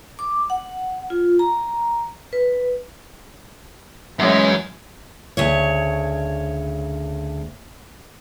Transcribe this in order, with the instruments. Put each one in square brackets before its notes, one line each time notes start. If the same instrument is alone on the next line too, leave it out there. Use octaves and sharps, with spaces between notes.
[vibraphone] D6
F#5
F4
A#5
B4
[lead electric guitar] F#2 C#4 [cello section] E3 G#3
[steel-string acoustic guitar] D2 C#3 C#5